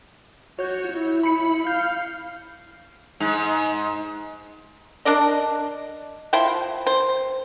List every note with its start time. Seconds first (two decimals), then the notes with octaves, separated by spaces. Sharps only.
0.59 F#4 C#5 G6
0.92 E4
1.23 B5 C#7
1.67 F5 G6
3.20 G#2
5.05 D4 A#4 D5 D#5
6.33 F3 E4 C5 G5
6.87 C5